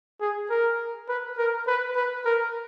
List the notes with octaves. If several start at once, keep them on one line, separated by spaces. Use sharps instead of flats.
G#4
A#4
B4
A#4
B4
B4
A#4